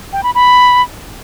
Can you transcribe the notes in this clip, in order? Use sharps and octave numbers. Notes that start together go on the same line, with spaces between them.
G5
B5
B5